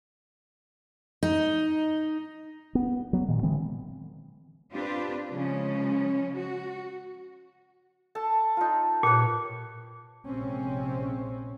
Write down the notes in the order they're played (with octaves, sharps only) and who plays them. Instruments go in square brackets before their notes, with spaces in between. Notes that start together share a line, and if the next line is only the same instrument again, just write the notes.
[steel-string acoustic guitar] D#4
[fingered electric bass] B3
F#3 B3
A#2 D#3
D3 E3 G#3 C4
[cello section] C4 D4 F4 G4 B4
C#3 F3 G#3 C#4
F#4
[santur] A4 A5
D#4 F4
[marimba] A#2 [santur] G4 B4 C#5
[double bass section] A#1 C3 G#3 C4 C#4